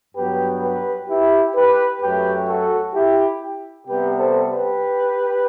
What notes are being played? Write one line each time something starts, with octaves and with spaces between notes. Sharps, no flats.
G2 F#3 B3 G4 B4
G4 B4
E4 G4
G4 B4
F#2 F#3 A3 G4 B4
F#4 A4
E4 G4
C3 G3 B3 G4 B4
A4 C5
G4 B4